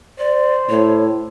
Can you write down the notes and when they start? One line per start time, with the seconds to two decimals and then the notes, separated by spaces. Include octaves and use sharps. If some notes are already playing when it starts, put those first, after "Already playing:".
0.19 C5 D5
0.70 A2 C#5